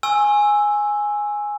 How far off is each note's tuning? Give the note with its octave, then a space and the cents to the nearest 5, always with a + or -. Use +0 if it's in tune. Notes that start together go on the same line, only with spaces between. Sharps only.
G#5 +0 C#6 -40 E6 +0